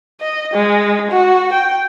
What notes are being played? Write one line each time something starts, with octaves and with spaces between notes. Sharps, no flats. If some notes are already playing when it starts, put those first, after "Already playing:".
D#5
G#3
F#4
G5